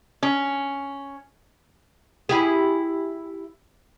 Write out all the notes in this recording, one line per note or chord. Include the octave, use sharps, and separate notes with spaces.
C#4
E4 G4 G#4